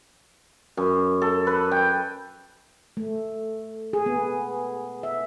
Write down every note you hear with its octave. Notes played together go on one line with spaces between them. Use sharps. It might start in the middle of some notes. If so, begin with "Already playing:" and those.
F#2
A4
B4
G5
A3
G#4
B3
E5